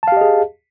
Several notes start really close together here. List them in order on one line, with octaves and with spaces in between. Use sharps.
A5 F5 G4 D#5 G#4